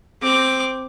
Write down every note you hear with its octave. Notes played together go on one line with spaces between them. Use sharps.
C4 D6